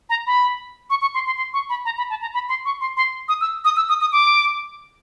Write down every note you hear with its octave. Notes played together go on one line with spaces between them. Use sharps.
A#5
B5
C#6
C#6
C6
C6
C6
C#6
B5
A#5
B5
A5
A#5
B5
C6
C#6
C6
C6
D#6
E6
D#6
E6
D#6
D#6
D6